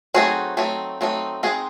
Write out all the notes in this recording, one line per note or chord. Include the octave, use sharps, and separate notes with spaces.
F#3 A3 C4 D#4 F#4 G#4
F#3 A3 C4 D#4
F#3 A3 C4 D#4
G#3 C4 D#4 F#4 G#4